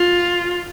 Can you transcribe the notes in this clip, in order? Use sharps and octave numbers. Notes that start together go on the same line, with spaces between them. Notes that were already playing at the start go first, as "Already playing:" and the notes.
Already playing: F4